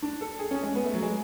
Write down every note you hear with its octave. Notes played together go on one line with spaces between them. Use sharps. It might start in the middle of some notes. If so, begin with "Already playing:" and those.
D4
A4
G#4
C#4
G#3
B3
A3
F#3
G#3